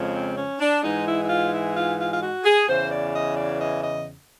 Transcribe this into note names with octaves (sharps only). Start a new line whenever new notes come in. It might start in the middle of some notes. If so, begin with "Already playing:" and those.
Already playing: F2 C#3 F3 G#3
C4
C#4
D4
G#2 E3 G#3 D#4
E4
E4
F4
E4
F4
F4
F4
F#4
G#4
E2 C#3 E3 C5
D5
D#5
D5
D#5
D#5